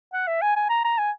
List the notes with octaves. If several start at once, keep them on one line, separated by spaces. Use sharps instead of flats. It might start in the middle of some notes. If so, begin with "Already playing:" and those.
F#5
E5
G#5
G#5
A#5
A#5
G#5